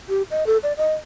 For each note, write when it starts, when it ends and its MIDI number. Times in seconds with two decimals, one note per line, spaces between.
0.09 0.22 67
0.31 0.46 75
0.47 0.58 69
0.63 0.73 74
0.77 0.93 75